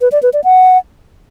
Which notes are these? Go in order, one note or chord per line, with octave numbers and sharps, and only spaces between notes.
B4
D5
B4
D5
F#5